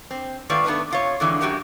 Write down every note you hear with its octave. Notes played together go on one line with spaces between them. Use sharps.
C4
G#2 D#3 A3 F4 B4 D5
A3 B3 D4 D#4 B4
C3 F4 C#5
F2 D3 E3 F#3 G#3
F#2 C#3 G#3 F#4 G4 A#4